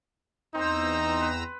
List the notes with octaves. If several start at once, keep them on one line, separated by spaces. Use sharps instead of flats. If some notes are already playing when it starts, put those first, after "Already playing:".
E2 C4 D#4 C5 A#5 E6
B4